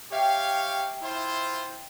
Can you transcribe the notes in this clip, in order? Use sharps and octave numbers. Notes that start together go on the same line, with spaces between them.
G4 C#5 E5 F5 G5
E4 F4 C5